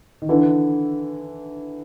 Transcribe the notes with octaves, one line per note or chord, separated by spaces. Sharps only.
D#3
D3 E3